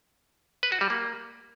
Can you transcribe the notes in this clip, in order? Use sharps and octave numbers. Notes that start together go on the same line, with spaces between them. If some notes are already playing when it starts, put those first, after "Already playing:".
B4
F#4
G3
A#3